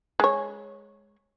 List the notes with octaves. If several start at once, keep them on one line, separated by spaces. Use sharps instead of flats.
G#3 C#5